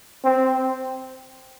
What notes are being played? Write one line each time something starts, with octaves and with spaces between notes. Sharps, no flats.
C4